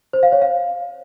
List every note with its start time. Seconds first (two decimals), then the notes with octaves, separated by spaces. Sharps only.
0.13 C5
0.23 F5
0.32 C#5
0.42 F5